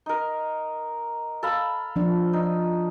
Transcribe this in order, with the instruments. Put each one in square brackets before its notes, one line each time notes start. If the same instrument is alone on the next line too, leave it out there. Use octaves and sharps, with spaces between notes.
[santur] D#4 A#4
A4 F5 B5
[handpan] F3 D4
[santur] D#4